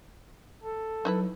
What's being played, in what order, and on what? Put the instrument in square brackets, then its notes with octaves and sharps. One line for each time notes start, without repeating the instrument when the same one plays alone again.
[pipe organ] A4
[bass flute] F#3 [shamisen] D#4 E4 B4